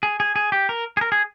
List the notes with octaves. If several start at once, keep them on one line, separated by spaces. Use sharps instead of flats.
G#4
G#4
G#4
G4
A#4
G#4
A#4
G#4